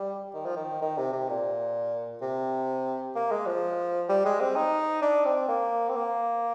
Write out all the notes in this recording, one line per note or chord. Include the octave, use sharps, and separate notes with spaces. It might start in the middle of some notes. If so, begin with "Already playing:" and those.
Already playing: G3
D#3
F3
D#3
D#3
C3
C3
A#2
C3
A#3
G#3
F3
G3
G#3
C4
D#4
D4
C4
A#3
C4
A#3